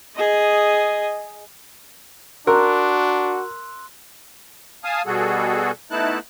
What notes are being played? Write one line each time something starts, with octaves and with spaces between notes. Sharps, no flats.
G#4 D#5
D4 F#4 A#4 C6 E6 F#6
F5 G#5 A5 D#6
B2 G3 F#4 G#4 A4
A3 B3 D#4 E4 A5 F#6